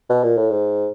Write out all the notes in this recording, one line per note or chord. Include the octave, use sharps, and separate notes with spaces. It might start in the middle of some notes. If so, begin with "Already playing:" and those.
B2
A#2
A2
G#2